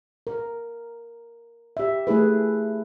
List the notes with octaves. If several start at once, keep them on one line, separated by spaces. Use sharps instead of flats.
A#4
G4 E5
A3 E4 G#4 B4